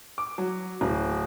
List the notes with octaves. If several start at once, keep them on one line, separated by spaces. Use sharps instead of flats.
D6
F#3
D1